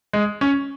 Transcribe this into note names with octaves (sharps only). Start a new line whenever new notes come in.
G#3
C#4